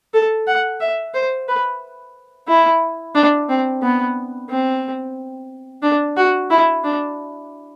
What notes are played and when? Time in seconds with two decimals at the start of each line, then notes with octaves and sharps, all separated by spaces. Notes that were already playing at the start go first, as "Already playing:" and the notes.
0.14 A4
0.47 F#5
0.81 E5
1.14 C5
1.48 B4
2.48 E4
3.15 D4
3.49 C4
3.82 B3
4.49 C4
5.83 D4
6.17 F#4
6.50 E4
6.84 D4